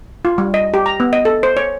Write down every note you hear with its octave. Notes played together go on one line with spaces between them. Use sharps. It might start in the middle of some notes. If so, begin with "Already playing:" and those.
F4
G3
D#5
G4
A#5
B3
D#5
A4
C5
C#5